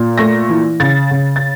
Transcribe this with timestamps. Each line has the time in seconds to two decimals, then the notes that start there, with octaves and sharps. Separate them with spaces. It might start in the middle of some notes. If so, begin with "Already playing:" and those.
Already playing: A#2
0.18 A3 A#6
0.49 E3
0.80 C#3 A6
1.11 C#3
1.36 A6